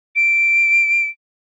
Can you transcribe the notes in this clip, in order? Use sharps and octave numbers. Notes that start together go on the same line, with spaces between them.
D7